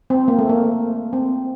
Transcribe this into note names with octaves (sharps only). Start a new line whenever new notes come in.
C4
A#3
A3
A#3
C4